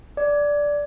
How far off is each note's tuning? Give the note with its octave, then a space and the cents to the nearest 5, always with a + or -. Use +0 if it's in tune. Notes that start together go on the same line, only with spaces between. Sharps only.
D5 -5